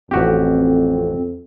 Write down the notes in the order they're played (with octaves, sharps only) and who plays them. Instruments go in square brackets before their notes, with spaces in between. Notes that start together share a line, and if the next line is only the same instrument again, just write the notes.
[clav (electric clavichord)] A1 F#4 G4 [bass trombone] F2 [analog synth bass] C4